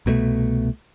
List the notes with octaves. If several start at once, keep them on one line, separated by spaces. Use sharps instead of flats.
C2 B2 D#3 A3